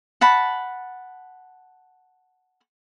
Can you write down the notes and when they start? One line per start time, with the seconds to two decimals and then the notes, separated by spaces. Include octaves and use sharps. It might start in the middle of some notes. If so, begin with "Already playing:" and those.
0.21 F#5 A5 B5